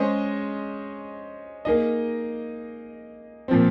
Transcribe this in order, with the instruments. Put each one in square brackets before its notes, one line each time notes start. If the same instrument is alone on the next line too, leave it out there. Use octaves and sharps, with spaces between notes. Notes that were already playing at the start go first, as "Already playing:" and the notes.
Already playing: [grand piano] G#3 C#4 G#4 C5 D#5
A#3 D#4 G#4 D#5
A#2 F3 C4